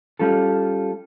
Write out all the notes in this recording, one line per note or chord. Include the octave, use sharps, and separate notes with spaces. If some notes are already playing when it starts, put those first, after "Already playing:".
G3 C#4 F4 A4